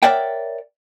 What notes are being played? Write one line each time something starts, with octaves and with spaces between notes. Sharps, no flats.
A#4 C#5 D5 E5 F#5 G5